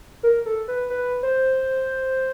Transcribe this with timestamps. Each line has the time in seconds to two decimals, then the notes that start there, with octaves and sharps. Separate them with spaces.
0.23 A#4
0.46 A4
0.68 B4
0.90 B4
1.23 C5